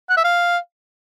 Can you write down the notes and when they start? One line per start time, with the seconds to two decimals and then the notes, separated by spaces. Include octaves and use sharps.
0.10 F#5
0.17 E5
0.24 F5